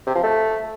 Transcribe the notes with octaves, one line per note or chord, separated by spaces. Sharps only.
C3
F3
A3